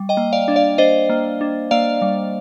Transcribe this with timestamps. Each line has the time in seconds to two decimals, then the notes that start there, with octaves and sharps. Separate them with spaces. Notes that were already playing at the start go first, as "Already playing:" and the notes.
Already playing: G3
0.09 D#5 G5
0.17 A#3
0.33 D5 F5
0.48 D4
0.56 D5 F5
0.78 D4 C5 D#5
1.10 A#3
1.41 D4
1.71 A#3 D5 F5
2.02 G3